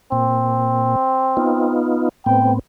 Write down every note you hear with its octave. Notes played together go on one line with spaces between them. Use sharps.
A#2 C4
B3 D#4 F4
A2 B3 C4 G5